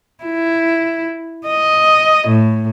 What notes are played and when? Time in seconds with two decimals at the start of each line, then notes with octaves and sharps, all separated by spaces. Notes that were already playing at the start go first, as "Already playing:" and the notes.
0.24 E4
1.47 D#5
2.28 A2